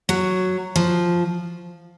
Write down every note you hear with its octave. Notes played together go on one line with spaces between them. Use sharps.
F#3
F3